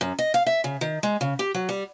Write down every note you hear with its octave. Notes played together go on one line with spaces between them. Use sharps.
F#2
D#5
F5
E5
C#3
D#3
G#3
C#3
G4
F#3
G3